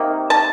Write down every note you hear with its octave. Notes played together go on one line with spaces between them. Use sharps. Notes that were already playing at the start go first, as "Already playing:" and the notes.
Already playing: C3 D#3 A#3
A5